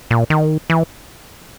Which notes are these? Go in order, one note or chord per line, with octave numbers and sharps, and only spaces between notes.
A#2
D#3
E3